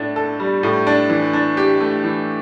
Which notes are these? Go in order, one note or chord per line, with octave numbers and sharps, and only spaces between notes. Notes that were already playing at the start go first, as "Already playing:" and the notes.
Already playing: A2 D4
A4
G3
A2
D4
E3
D4
G4
A3
E3